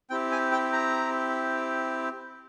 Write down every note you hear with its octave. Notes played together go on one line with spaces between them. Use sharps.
C4 E4 G4 G5
G#5
G5
A#5